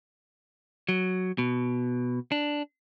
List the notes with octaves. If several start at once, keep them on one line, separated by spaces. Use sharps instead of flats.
F#3
B2
D4